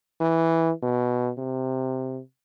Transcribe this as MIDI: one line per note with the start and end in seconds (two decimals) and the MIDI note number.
0.21 0.71 52
0.82 1.31 47
1.38 2.20 48